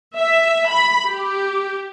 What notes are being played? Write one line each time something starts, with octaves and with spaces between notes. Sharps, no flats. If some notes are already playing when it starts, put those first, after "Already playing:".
E5
B5
G4